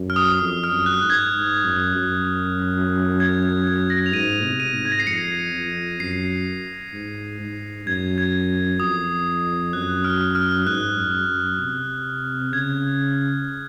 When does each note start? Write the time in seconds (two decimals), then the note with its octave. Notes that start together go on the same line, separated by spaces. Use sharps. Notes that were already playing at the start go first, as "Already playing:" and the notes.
Already playing: F#2
0.10 F6
0.16 D#6
0.39 F2 D#6
0.64 F6
0.71 F#2
0.86 F#6
1.02 G#2
1.10 G#6
1.33 G#2
1.65 F#2
1.95 F#2
3.20 G#6
3.43 G#6
3.67 G#6
3.90 A#6
4.06 F7
4.13 G#2 D#7
4.44 C3
4.60 D#7
4.75 G#2
4.85 G#6
4.92 A#6
5.00 C7
5.07 F2 C#7
5.53 F2
6.00 F#2 C7
6.93 G#2
7.40 G#2
7.86 F#2 G#6
8.18 G#6
8.80 F2 D#6
9.73 F#2 F#6
10.04 F6
10.35 F6
10.66 G#2 F#6
10.98 F#2
11.29 F#2
11.60 C3
12.53 C#3 G#6